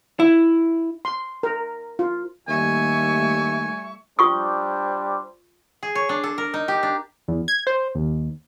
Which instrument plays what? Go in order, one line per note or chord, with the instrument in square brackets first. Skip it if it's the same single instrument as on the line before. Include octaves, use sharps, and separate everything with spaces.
[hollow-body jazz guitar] E4
[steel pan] C6
A#4
F4
[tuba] D#2 [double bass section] G3 A3 [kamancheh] E5 C#6 [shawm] G#5
[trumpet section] G3 D4 C5 [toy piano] F4 C#6 D#6
[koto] G#4
C#5
D4
A4
A#4
D#4
G4
D4
[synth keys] E2
G#6
C5
D#2